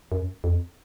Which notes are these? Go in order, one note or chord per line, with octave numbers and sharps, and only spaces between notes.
F#2
F2